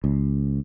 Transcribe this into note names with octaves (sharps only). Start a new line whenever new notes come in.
C#2